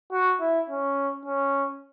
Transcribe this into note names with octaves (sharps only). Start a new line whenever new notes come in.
F#4
E4
C#4
C#4